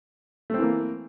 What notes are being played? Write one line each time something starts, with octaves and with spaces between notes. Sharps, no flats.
E3 A3 A#3 C4